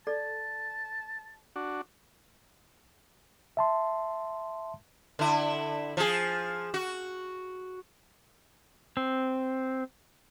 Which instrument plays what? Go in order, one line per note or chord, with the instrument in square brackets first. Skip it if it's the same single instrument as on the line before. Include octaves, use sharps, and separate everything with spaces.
[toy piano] A4 D5 [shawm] A5
[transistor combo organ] D4 F#4
[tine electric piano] E5 A5 C6
[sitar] D3 E4
F3 G#4
F#4
[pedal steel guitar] C4